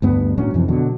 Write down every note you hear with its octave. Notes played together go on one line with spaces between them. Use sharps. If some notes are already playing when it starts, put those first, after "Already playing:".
D2 G2 B3
A2 F#3 C#4 D4
F2 C3 E3
B2 D3 F#3